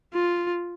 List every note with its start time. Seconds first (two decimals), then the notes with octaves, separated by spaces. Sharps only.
0.14 F4